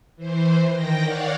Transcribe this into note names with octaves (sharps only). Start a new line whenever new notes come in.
E3 C5
D#3 G5 A#6
C#5 D5 F5 F#5